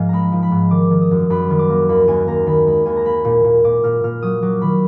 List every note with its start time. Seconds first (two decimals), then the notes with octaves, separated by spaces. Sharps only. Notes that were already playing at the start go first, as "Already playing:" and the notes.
Already playing: G#2 F3 D#5 F5 G#5
0.09 G#3 A#5 B5
0.32 F3
0.43 B5
0.51 G#2
0.71 D#3 D6
0.91 D#3
1.01 D#6
1.11 F#2
1.30 F#2 B5
1.50 D#3
1.59 D6
1.70 A#3
1.89 D#2 B5
2.07 D#2 G#5
2.27 D#2 A#5
2.47 D#3 B5
2.67 G#3 B5
2.86 D#2 G#5
2.97 A#5
3.05 A#3 B5
3.25 A#2
3.44 A#2
3.64 A#2 D6
3.84 A#2 F6
4.04 A#2 F6
4.22 F#3 D#6
4.42 F#3 D6
4.61 D#3 B5